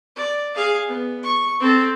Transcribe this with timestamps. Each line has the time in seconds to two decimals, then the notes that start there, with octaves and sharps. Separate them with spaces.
0.16 D5
0.56 G#4 F5
0.88 B3
1.23 C#6
1.61 C4 A4